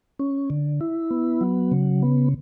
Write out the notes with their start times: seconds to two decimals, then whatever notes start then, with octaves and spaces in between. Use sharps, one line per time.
0.19 C#4
0.50 D3
0.81 E4
1.11 B3
1.41 F#3
1.72 C#3
2.03 B3